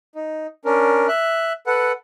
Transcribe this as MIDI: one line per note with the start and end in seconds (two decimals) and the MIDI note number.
0.15 0.47 63
0.65 1.07 61
0.65 1.07 62
0.65 1.07 70
1.08 1.53 76
1.08 1.53 90
1.67 1.92 69
1.67 1.92 71
1.67 1.92 78